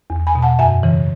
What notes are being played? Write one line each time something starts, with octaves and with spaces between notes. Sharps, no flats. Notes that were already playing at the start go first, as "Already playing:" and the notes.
E2
G#5 B5
B2
F#5 A5
F#2 E5 G#5
C#3 E3